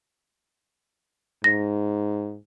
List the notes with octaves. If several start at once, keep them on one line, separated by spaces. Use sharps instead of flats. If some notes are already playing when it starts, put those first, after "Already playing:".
G#2 A#6